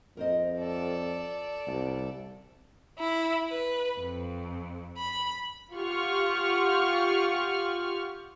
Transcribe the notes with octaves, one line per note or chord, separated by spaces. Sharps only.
F2 A#4 C5 D#5
A4 D5
C2 A5
E4
B4
F2
B5
F4 G4 F#5 C#6 F6